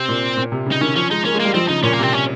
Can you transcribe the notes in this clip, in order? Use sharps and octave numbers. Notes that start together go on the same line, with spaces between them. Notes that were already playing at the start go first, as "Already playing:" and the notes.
Already playing: C3 C4
A#2
A#2
C3
C#3
D#4
D#3 C#4
F3 C#4
G#3 D#4
A#3 C#4
G#3
A#3
G3
F3 C4
C#3 D#4
A#2 C#4
A#3
C3 C4
C#4